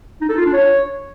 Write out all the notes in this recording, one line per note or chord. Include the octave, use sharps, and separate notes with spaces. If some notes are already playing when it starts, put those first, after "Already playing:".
D#4
A4
F4
D4
C#5